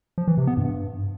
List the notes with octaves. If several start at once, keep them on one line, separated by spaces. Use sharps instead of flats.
F3
E3
C3
B3
G2